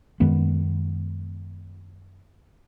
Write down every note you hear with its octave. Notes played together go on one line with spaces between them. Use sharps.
F#2 D#3 G#3 B3